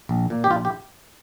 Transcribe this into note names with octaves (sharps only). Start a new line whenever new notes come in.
A#1
A#2 A#3
G4
A#1 F4
G4